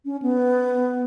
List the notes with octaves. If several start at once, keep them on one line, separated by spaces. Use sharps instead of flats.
C#4
B3